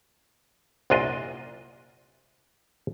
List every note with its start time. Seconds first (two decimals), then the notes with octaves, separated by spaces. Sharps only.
0.90 C2 F#2 A#2 D4 F4 D#5